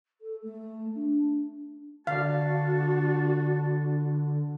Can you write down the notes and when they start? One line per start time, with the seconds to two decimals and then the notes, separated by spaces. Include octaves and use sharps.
0.21 A4
0.42 A3
0.95 D4
2.07 D3 D4 F#4 D5 F5 A5